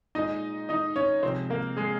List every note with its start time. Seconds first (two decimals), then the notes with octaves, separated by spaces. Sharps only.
0.15 A#2 G#3 D#4 D#5
0.69 D#4 D#5
0.96 C#4 C#5
1.23 C3 F3 G#3 C4 C5
1.50 A#3 A#4
1.77 G#3 G#4